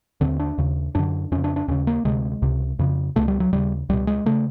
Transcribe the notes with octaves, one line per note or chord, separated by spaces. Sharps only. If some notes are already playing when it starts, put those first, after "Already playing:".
D#2 D3 C4
D4
D#2 C#3
F#2 D3 D4
F2 C#3 C#4
D4
D4
D#2 C#3 C#4
A#3
D2 C3 G#3
C#2 C3
F2 C#3
C#2 B2 A3
G3
F#3
D#2 C#3 G3
C#2 B2 G3
G#3
C#3 A3